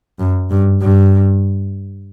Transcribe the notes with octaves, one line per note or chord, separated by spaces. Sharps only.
F#2
G2
G2